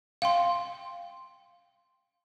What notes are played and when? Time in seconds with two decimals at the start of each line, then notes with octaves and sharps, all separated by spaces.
0.22 F5 G5 C6